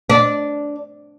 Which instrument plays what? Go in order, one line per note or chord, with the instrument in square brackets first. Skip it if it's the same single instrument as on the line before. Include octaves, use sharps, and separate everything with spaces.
[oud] D4